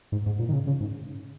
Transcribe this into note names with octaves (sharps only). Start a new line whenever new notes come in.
G#2
G#2
A#2
D#3
C#3
C#3
G#2